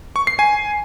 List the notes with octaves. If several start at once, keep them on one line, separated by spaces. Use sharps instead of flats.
C#6
C7
G#5